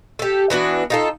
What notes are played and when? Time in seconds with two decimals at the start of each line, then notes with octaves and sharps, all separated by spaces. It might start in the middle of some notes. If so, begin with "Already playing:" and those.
0.19 G4 A4
0.50 E3 B3 D4 F#4
0.90 D#4 F4 A4